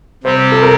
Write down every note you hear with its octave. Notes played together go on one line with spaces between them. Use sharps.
C3 G3 C4 G4 C5
A4
A#4